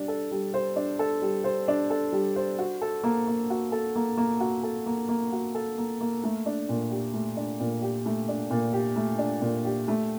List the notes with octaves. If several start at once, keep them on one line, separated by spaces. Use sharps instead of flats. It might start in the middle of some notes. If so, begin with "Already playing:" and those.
Already playing: G3 D4
A4
G3
C5
D4
A4
G3
C5
D4
A4
G3
C5
F#4
A4
A#3
A#3
F#4
A4
A#3
A#3
F#4
A4
A#3
A#3
F#4
A4
A#3
A#3
A3
D4
A#2
G4
A3
D4
A#2
G4
A3
D4
A#2
G4
A3
D4
A#2
G4
A3